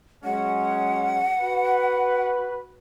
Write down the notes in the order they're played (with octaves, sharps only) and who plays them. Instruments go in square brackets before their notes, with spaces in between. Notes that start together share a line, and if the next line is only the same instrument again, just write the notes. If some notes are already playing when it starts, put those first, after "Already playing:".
[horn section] F#3 G#3 C#4 [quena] F#5
[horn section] F#4 B4